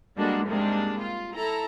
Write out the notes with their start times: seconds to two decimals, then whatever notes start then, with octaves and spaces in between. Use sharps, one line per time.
0.17 G3 G#3 A#3 D4 F#4 A4
0.46 G#2 C3 G3 G#3 A#3 D4
1.00 F4
1.34 E4 A4 A#5